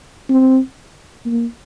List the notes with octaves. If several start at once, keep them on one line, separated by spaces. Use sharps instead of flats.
C4
A#3